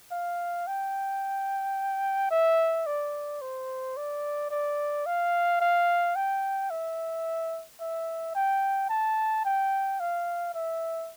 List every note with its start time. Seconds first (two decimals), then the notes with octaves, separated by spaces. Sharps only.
0.11 F5
0.67 G5
2.31 E5
2.86 D5
3.41 C5
3.96 D5
4.51 D5
5.06 F5
5.60 F5
6.16 G5
6.71 E5
7.80 E5
8.35 G5
8.90 A5
9.45 G5
10.00 F5
10.54 E5